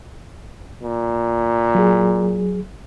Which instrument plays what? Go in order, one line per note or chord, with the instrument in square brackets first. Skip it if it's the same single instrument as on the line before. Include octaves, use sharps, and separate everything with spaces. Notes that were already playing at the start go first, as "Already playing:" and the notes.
[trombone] A#2
[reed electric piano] F#3 G#4